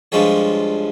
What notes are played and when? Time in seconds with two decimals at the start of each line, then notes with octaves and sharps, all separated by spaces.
0.12 G2 F3 G#3 C#5